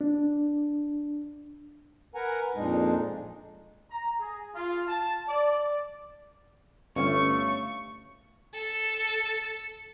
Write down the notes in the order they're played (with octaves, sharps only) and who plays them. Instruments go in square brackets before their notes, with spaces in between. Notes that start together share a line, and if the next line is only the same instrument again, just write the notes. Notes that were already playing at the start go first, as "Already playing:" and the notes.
[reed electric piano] D4
[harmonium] A#4 B4 F#5 G#5 A#5
F2 A#2 G#3 D4 D#4
[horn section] A#5
G#4
F4
A5
D5
[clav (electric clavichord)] G1 [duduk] A3 [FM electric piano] C#4 C#5 F5 [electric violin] C#6
[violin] A4